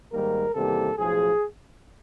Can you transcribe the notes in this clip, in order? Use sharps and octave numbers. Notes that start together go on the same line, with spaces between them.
G#2 D#3 G3 A#3 A#4
E2 C3 D#3 G3 A#3 A4
B1 A2 F3 G#4